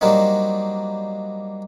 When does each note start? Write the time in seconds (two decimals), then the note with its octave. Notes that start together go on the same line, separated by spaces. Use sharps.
0.01 F#3 G3 A#3 C4 D4 D#4